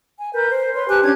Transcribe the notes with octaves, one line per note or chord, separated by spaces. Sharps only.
G#5
A#4 B4 G6
C5
B4 C#5 C6
G4 G#5 A5 F#6
C#4 D4 G4 G#6